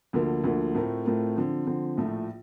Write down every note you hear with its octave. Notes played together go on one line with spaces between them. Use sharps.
D2 D3 F3 A#3
D2 D3 F3 A#3
A2 A3 C4 F4 A#4
A2 A3 C4 F4 A#4
D3 F3 C4
D3 F3 C4
A#1 A2 F3 A3